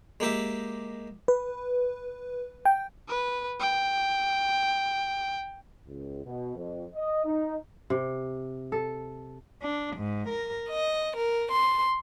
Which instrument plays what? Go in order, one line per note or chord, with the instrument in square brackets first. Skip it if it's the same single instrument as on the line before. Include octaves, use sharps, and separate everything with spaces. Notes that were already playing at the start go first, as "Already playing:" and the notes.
[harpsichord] G#3 A#3 G4 E5
[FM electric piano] B4
G5
[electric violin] B4
G5
[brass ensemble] C#2
B2
F2
D#5
D#4
[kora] C3
A4
[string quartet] D4
G#2
A#4
D#5
A#4
C6